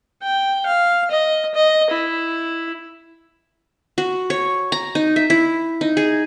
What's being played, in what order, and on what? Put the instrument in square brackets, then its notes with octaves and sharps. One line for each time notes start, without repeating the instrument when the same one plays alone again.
[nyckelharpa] G5
F5
D#5
D#5
E4
[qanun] F#4
C#5
A#5
D#4
E5
E4
D#4
G#4